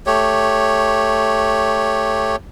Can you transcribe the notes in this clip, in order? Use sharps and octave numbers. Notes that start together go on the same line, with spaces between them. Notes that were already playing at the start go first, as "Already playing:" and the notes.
A3 G4 C#5